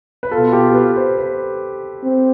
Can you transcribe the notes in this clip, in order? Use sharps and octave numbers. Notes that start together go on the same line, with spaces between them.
B4
B2 B3 F4 A4
G4
B4
C5
B4
C4